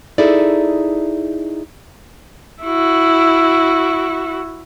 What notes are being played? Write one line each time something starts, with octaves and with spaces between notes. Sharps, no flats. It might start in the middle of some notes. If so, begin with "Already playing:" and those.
D#4 E4 G#4 A4 D5
E4 F#4